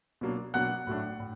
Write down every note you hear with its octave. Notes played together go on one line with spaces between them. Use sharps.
B2 F#3 A#3 D4
B2 F#3 A#3 D4 F#5 F#6
A2 F#3 A3 D4
A2